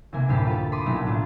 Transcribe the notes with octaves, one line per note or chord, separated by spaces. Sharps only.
B1 C3 A#3 G#5
F#1 D2 A2 G4 B5 C7
F4 A4
B5 C6 D6 D#6
B1 A#2 F#3 A3 E4 A#5
A2 D4 F4